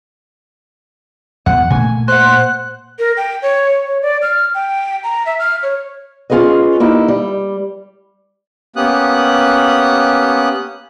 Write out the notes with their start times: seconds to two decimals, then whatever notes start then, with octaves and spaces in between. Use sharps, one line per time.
1.46 E2 F#5
1.70 A#2 A3 A#3 G#5
2.08 C5 F#5 F#6
2.99 A#4
3.17 G5
3.42 C#5
3.86 C#5
4.02 D5
4.22 F6
4.55 G5
5.04 A#5
5.26 E5
5.39 F6
5.63 C#5
6.30 C#4 F4 G#4 B4 D#5
6.80 A#3 D#4 E4 G4
7.08 G3
8.76 A#3 B3 C#4 G4 D#6 F#6